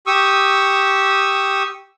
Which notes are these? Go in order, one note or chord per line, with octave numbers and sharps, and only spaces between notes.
G4 C#6 D#6 E6